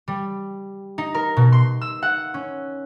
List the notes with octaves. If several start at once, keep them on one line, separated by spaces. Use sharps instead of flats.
G3
D#4
A#4
B2
C6
E6
F#5
C#4